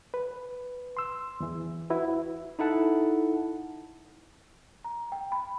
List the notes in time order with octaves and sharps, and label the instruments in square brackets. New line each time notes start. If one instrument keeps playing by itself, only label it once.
[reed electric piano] B4
C6 E6
E2 E3
E4 F#4 B4
[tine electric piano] D#4 E4 A4 F#5 A5
[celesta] A#5
G5
B5